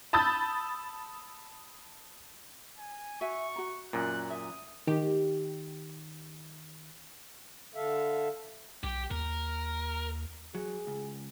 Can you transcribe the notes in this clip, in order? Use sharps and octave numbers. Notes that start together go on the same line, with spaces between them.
A5 B5 D#6 E6 G6 A6
G#5
F#4 E5 G#5 C#6
F#4 A#5
F#2 A#2 F#6
E5 D#6
D#3 G4
D3 A4 E5 F5
B1 G4
D#2 A#4
F#3 G#4
C#2